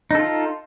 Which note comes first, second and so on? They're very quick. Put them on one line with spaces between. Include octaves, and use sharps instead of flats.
D#4 A4 F4